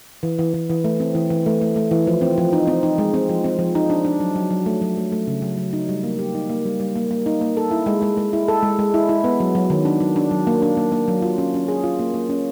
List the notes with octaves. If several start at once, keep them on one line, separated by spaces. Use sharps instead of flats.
E3
E3
E3
E3
A3
C4
E3
E3
A3
A3
A3
E3
F3
C4
F3
D#4
C4
D#4
G#3
C4
F3
C4
F3
D#4
D4
D4
F#3
F#3
F#3
A3
F#3
A3
A3
C#3
F#3
F#3
D#4
G3
A#3
G4
D#4
A#3
G3
G3
A#3
A#3
D#4
A#3
A4
E4
G#3
G#3
G#3
E4
A4
G#3
G#3
E4
E4
B3
F#3
F#3
D#3
D4
F#3
D4
F#3
A#3
D4
A#3
A#3
F#3
F4
C#4
C#4
G#4
F4
A#3
A#3
C#4